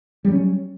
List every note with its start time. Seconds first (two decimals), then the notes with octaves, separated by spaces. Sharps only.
0.25 G3
0.28 F#3
0.32 C#4